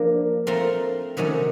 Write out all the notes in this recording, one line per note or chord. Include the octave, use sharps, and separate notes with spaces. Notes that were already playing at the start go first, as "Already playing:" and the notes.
Already playing: F3 A#3 D4
A3 C4 F4 A#4
C3 D#3 F#3 A3 C#4